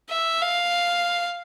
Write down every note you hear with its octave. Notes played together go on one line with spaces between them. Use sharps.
E5
F5